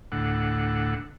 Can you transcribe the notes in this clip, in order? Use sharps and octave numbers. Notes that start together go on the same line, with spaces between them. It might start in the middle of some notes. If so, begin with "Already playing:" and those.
D2 A2 F#5